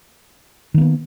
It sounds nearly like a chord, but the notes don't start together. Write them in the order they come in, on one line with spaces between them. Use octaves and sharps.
D#3 A#3 B3